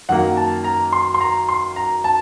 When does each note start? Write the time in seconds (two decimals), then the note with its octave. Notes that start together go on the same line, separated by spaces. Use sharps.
0.09 F#2 D#3 F#3 A#3 F#5
0.37 A5
0.64 A#5
0.92 C6
1.14 C6
1.21 A#5
1.49 C6
1.76 A#5
2.04 A5